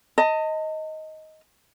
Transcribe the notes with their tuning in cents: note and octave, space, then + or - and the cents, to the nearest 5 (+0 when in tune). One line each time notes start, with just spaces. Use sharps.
D#5 +10 A5 +40